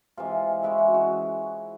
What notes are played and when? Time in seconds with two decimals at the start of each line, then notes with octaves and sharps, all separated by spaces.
0.17 C3 E3 G#3 F4
0.63 E3 G#3 C#4 E4
0.78 F#4
0.94 F#4